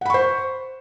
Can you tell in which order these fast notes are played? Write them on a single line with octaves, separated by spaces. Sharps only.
F#5 B5 C#6 C5